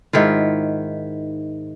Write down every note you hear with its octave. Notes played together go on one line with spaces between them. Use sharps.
G#2 D#3 E4 F4